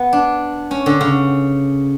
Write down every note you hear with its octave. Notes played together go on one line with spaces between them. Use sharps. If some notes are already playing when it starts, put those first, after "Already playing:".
Already playing: B3
D4
C#4
D3
C#3